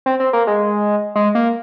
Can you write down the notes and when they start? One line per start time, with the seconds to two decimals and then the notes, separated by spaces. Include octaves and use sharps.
0.06 C4
0.20 C4
0.33 A#3
0.47 G#3
1.15 G#3
1.35 A#3